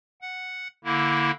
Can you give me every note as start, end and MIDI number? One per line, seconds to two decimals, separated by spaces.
0.21 0.68 78
0.84 1.31 50
0.84 1.31 58
0.84 1.31 64